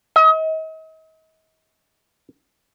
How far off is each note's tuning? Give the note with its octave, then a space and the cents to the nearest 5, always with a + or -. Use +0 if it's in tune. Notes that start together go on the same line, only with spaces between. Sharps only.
D#5 +40